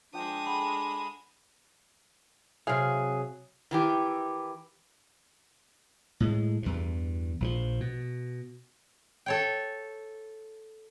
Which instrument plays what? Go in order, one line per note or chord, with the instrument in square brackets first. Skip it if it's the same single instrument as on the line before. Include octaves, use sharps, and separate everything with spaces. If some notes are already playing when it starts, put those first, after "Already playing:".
[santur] F3 G5 [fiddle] G#3 D#6 [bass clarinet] D4
[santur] G#4 A4 F#5 [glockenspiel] B5
[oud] C3 F5 [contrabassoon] F#3 [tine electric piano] G#4
[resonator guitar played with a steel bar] D#3 E3 G4
[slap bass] A2 G#3
E2 G2
A#1 E3 F3
B2
[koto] A4 C#5 G5